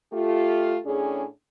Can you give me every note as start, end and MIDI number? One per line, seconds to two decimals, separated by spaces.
0.11 0.76 57
0.11 0.76 65
0.11 0.76 67
0.84 1.24 45
0.84 1.24 61
0.84 1.24 62
0.84 1.24 68